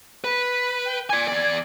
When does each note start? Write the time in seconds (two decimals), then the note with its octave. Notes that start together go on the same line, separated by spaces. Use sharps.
0.24 B4 B5
0.85 G5
1.10 D5 G#5 G#6
1.28 E2 D5